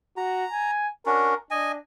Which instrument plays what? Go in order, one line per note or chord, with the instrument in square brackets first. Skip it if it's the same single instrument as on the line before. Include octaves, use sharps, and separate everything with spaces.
[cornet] F#4 [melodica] A#5
[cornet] G#5
[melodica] C#4 D4 F#4 [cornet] A#4
[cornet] D4 [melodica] D#5 G#5